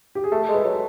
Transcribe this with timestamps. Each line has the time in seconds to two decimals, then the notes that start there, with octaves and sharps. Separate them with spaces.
0.15 G4
0.24 G#4
0.32 A3 A4
0.49 G#3
0.54 B4
0.65 F#3